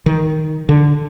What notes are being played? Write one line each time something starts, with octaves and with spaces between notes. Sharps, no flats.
D#3
D3